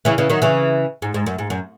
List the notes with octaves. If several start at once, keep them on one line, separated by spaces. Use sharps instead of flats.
C#3 E3
C#3 E3
D#3 F#3
C#3 E3
G#2
G#2
F#2
G#2
F#2